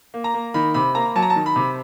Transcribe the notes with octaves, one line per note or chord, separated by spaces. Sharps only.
A#3
A#5
A#3
D#3 B5
C3 B5
A#3 A#5
F#3 A5
A#5
A5
D#3
B5
C3